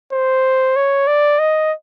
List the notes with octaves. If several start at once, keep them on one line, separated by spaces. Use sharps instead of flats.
C5
C#5
D5
D#5